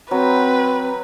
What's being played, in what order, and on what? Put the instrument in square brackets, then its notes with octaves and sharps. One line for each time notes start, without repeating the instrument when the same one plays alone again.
[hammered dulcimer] F#3 [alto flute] C4 [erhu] B4